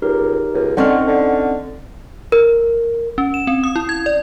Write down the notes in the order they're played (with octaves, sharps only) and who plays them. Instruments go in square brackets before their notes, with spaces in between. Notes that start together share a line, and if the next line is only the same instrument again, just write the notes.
[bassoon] C#2 [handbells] D#4 G4 A#4
[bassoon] C#2
[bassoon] D3 [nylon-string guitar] C4 C#4 D#4 [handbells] F#5 C#6 F6
[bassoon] D3
[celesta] A#4
[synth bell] C#4
E7
C4
D#6
E4
G#6
D5